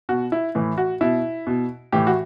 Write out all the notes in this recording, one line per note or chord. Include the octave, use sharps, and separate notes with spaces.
B2 F#4
E4
A2 E3
F#4
B2 E4
B2
A2 E3 G4
F#4